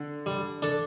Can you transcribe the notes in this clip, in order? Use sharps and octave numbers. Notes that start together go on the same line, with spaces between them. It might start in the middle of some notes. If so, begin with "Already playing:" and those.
Already playing: D3
G3
D4 A4